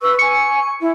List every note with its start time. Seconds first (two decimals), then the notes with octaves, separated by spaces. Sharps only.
0.02 B4 C#6 E6
0.19 G#5 C#6 C#7
0.80 E4